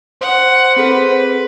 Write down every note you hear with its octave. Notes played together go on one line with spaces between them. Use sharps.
C5 F#5
C4 G#4 A4 B4